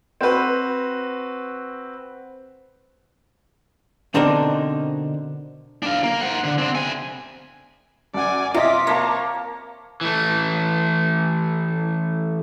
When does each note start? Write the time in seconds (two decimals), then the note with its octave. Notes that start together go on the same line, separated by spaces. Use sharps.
0.21 C4 F#4 B4
4.14 B2 D3 C4 D4 D#4 A#4
5.83 D4 F5
6.04 A#3
6.21 C5 F#5
6.44 D3
6.58 C4 D4
6.75 C3 G#5
8.14 F#2 D5 F#5 G#5
8.54 C3 F4 D#5 D6 B6
8.87 A#3 A#4 C#5 A5 A#5
10.01 E3 A3